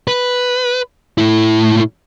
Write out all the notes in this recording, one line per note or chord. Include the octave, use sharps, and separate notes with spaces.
B4
A2 E4